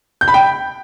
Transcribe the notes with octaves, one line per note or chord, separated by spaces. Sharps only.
G6
B5
G5